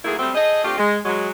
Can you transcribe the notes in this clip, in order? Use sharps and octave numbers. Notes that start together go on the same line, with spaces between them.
D#3 F#3 A3 A#3 E4 G#4
F#3 G3 A3 C4
G#4 A4 C5 D#5
A3 C4 D4 F4 G4
G#3
F#3 G#3